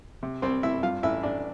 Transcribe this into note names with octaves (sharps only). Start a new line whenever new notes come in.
C3
C2 C4 C5
C2 E4 E5
G2 F4 F5
A1 E4 E5
A1 D4 D5